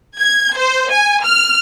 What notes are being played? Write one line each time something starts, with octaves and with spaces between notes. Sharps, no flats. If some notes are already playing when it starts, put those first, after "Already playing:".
G#6
C5
G#5
F6